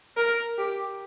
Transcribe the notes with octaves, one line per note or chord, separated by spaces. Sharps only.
A#4
G4